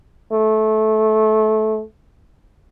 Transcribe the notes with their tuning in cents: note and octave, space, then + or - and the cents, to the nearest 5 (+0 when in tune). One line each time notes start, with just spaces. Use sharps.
A3 -20